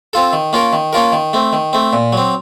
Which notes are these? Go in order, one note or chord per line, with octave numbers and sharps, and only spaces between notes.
C4 F4 A4
D#3
A#3 C#4 F4 A#4
D#3
A#3 C#4 F4 A#4
D#3
A3 C4
D#3
A3 C4
A#2
F#3 C4